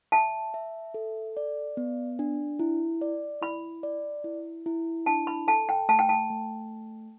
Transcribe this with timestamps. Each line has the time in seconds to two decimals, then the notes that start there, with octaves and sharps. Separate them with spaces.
0.12 E5 A5
0.54 E5
0.94 A4
1.37 D5
1.77 B3
2.19 D4
2.59 E4
3.01 D5
3.41 E4 B5
3.83 D5
4.24 E4
4.66 E4
5.06 D4 A5
5.27 B5
5.47 A4 A5
5.69 G5
5.89 A3 A5
5.99 G5
6.09 A5
6.30 A3